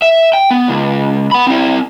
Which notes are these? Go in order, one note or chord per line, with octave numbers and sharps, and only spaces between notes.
E5
G5
B3
C#2
F#5 B5
C4 E4